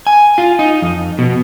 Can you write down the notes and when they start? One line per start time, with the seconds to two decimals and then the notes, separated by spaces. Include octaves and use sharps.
0.07 G#5
0.38 F4
0.59 D#4
0.82 F2
1.19 B2